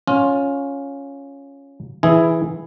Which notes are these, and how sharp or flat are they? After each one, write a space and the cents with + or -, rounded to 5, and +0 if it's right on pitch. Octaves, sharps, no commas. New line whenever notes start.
C#4 +0 F4 +15
E3 +0 E4 +0 G#4 +0